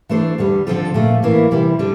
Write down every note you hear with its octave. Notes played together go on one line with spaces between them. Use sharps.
E3 A3 D4 A4 C5
E2 D3 G3
D3 F3 C4 F4 A4
A#2 F3 A3
A2 E3 A#3 E4
C3 E3 G3
D3 G3 D4